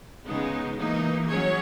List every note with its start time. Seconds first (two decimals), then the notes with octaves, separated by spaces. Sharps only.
0.26 C#3 G#3 B3 D#4
0.77 E3 A#3 D#4
1.28 F#3 C#4 G#4 C#5